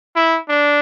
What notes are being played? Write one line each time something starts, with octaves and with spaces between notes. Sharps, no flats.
E4
D4